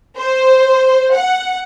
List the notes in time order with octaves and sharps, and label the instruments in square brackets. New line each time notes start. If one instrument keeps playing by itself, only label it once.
[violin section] C5
F#5